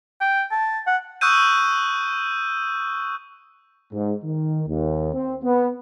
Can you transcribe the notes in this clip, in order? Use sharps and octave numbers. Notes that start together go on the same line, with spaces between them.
G5
A5
F#5
C#6 D#6 E6 F#6 G6 D#7
G#2
D#3
D#2
C4
B3